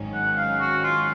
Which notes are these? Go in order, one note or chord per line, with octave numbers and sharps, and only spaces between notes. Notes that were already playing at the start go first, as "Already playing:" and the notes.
Already playing: G#1 G#2 D#3 F#3 C#4
F#5
F5
F#4
F4